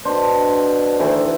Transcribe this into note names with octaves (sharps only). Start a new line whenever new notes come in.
B2 D4 C5
D2 D#3 E3 E4